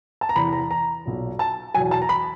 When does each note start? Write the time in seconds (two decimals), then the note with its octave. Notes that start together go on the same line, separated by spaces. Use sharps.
0.21 A5
0.29 A#5
0.36 E2 C3 E3 B5
0.53 A#5
0.71 A#5
1.05 B1 A#2 F#3
1.39 A5
1.74 E2 B2 F#3 G#5
1.91 A5
2.02 A#5
2.09 B5